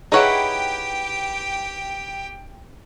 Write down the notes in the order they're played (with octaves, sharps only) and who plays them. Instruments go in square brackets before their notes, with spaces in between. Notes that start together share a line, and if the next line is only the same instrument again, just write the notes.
[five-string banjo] D#4 E4 C#5 [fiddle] G4 G5 [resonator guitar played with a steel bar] G#4 B4 F#5